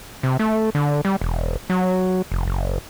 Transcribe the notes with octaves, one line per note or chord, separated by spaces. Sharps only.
C3
A3
D3
G3
E1
F#3
F1
F#1